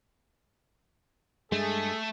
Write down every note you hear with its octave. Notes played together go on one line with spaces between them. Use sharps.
G2 G#3 A3 G#4 A4